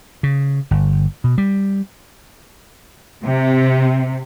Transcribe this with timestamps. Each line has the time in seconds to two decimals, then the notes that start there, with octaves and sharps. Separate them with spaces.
0.23 C#3
0.71 G1
1.24 B2
1.38 G3
3.24 C3